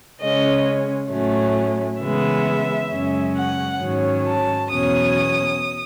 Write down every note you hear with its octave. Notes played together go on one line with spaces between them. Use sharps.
C#3 G#3 C#4 D#5
A2 F#3 A3 C#4
C#3 E3 G#3 B3 E5
F#2 C#3 G#3 C#4
F#5
G#2 D#3 F#3 C#4
A5
E2 B2 F#3 C#4 D#6